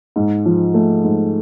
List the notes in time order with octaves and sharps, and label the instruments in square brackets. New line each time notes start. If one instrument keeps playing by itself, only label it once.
[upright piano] G#2
F3
A3
G#2